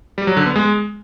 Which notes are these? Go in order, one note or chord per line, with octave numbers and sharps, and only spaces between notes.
G3
F#3
D3
B3
G#3